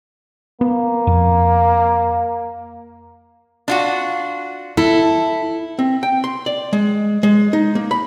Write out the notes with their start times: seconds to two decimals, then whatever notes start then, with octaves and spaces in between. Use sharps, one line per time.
0.61 A#3 B3
1.07 F2
3.68 D4 F4 F#4
4.77 E4 A4
5.79 C4
6.03 G5
6.24 C6
6.46 D5
6.73 G#3
7.23 G#3
7.53 D#4
7.75 A#3
7.91 B5